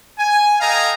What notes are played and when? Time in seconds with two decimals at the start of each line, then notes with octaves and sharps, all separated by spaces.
0.19 G#5
0.60 A4 D#5 F5 G5 G#5 A#5